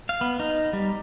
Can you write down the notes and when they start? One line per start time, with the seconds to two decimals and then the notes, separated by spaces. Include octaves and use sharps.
0.09 F5
0.21 B3
0.40 D#4
0.73 G3